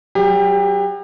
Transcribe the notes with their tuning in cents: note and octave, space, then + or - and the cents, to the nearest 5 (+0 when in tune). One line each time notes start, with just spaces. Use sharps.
F#3 +25 G4 +35